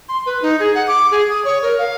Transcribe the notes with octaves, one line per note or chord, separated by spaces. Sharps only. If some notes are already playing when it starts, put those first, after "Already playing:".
C6
B4
D#4
G#4
F#5
D6
G#4
D#6
C#5
A#4
F5